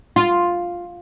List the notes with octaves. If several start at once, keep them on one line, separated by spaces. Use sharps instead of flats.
F4